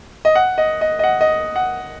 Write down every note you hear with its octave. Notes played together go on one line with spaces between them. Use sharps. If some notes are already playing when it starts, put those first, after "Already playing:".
D#5
F#5
D#5
D#5
D#5
F#5
D#5
F#5